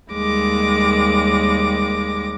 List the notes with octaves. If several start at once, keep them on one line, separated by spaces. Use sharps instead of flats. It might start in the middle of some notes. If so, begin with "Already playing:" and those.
D#2 G3 G#3 D6 A#6